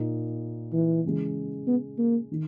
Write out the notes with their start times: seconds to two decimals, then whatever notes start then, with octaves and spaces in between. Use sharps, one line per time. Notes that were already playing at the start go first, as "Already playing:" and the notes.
Already playing: A#2 A#3 D#4
0.73 E3
1.04 C#3 E3 G#3
1.67 B3
1.99 A#3
2.32 D#3